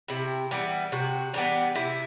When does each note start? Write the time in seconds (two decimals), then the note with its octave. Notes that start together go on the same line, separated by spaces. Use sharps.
0.08 C3 E4
0.51 E3 G3 B3
0.92 C3 F#4
1.34 E3 G3 B3 D4
1.75 C3 E4